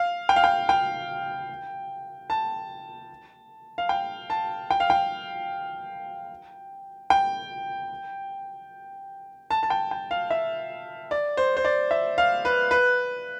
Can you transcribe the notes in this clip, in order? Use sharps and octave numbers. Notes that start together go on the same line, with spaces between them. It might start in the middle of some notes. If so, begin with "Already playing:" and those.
Already playing: F5
G5
F5
G5
G5
A5
F5
G5
A5
G5
F5
G5
G5
A5
A5
G5
G5
F5
E5
D5
C5
C5
D5
E5
F5
B4
B4